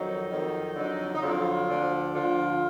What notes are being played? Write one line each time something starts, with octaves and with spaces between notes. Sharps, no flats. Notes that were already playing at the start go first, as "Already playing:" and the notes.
Already playing: F2 D#3 F#3 D#4
F2 D#3 F#3
F2 D3 F#3
D#4
F2 D3 F#3 F4
D2 D3 F3
D2 D3 F3 F4